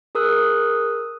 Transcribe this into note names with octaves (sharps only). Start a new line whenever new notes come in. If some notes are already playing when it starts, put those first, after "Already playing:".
G#4 A#4 D#6 E6 F#6